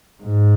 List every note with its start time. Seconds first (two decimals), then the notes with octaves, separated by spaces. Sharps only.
0.23 G#2